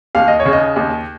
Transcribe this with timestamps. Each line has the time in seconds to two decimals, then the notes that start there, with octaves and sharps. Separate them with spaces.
0.15 D#2 F5
0.28 D#5
0.40 C#5
0.45 C#3
0.53 D#5
0.76 D#2